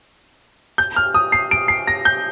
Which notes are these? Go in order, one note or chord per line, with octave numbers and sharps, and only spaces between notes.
G6
F6
D#6
C7
D7
C7
A#6
G6